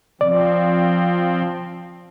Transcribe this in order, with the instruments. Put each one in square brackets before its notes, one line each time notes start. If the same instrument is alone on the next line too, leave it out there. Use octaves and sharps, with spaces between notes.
[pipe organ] F3 C4 [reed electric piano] D5